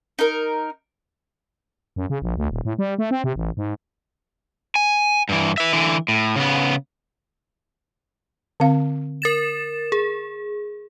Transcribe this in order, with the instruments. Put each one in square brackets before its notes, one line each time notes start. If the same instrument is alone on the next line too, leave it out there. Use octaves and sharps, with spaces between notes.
[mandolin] D#4 A#4
[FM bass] F#2
C#3
A#1
D2
D#1
A2
G3
A3
C4
C3
A1
G#2
[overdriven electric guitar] G#5
G2 E3
B4 E5
D3 E3
A2
C#3 B3
[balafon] D3 C4 F5
[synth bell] A#4 A6 E7
G#4